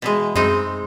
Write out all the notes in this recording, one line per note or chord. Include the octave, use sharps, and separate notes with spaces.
B2 E3 G#3
F#2 G#3 C4 D#4